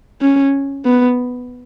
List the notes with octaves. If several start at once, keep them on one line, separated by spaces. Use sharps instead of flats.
C#4
B3